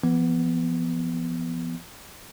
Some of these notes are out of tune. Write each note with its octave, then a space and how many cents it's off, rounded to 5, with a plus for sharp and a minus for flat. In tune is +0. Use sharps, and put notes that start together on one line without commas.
F3 -40 B3 +0